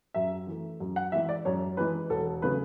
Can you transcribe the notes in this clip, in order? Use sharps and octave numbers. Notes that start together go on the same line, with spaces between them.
F#2 E5
E3 A3
F#2
F#5
E3 G#3 E5
D5
F#2 C#5
E3 G#3 B4
E1 A4
C#3 F#3 A3 B4